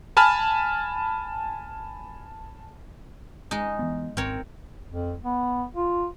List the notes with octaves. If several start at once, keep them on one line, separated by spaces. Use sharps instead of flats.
G#5 A5 B5 F6
G#3 D#4
E3 B3
G#1 C4 A#4 C#5
F2
B3
F4